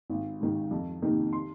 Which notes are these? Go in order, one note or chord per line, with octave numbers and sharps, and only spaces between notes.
G#1
G#2 D#3
F2
C3 D#3 A#3 D#4
C6